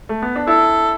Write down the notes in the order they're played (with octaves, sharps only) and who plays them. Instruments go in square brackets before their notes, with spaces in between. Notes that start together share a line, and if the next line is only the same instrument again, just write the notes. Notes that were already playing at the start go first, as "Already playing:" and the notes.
[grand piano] A3
B3
D4
[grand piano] E4 [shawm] A4